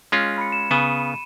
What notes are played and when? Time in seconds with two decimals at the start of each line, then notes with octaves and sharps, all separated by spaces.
0.12 G#3 C#4 F4
0.38 B5 C#7
0.52 E7
0.71 C#3 B3 D#7 E7